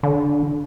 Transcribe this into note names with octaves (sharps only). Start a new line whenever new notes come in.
D3